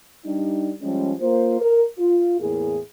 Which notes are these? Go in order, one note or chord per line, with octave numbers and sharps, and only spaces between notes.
G3 D4 D#4
F3 G3 G#3 C#4
A#3 F4 C5
A#4
F4
E2 A2 A#3 E4 G#4